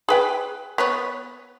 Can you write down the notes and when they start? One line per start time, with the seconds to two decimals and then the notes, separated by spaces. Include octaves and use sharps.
0.09 G#4 B4 G5
0.78 B3 B4 C#5